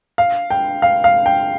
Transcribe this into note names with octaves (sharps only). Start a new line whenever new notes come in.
F5
G5
F5
F5
G5